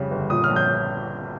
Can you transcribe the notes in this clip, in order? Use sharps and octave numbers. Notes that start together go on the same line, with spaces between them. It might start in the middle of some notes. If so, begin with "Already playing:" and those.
Already playing: F2 C#3 G3
G1
A#2 D#6
F6
A#1
G6